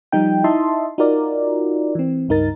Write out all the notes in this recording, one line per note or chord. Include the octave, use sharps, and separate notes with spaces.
F3 G3 D#4 G5
D#4 E4 D#5 E5 A5 C6
D#4 F4 F#4 A#4 D5
E3 C4
C#2 G2 D#4 A#4 A6